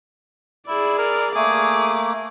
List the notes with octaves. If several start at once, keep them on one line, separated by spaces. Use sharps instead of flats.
E4 G#4 D5
A#4
A3 A#3 G#4 D6